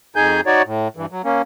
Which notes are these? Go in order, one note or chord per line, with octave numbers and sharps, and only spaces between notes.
F2 D#4 G#4 G#5 G6
D#4 F#4 C#5 D5
A2
G2 E3
F#3
A#3 C#4